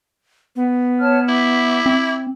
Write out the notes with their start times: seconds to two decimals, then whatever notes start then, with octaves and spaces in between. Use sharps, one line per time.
0.56 B3
1.00 C#5 A5 F6
1.29 E4 E5 D6
1.86 C4